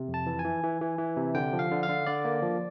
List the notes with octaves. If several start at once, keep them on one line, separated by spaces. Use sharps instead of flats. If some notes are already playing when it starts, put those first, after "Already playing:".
Already playing: C3
F2
A5
E3
G#5
E3
E3
E3
E3
C3
D3 G5
F3
F5
D3
F5
D3
D3 D5
A#3
F3